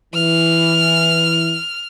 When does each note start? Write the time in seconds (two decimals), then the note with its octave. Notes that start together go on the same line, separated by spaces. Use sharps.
0.14 E3 F6